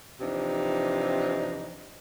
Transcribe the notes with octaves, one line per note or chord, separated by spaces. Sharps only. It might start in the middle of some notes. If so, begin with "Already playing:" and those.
C3 E3 F3 D4 D#4